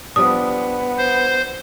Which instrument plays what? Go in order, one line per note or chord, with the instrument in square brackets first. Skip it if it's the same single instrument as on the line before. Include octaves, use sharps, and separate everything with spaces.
[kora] F3 G3 D4 [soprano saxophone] B3 [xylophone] D#6
[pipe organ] C5